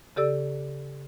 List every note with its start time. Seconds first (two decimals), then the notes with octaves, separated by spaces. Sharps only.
0.16 C#3 G4 A4 D5 E6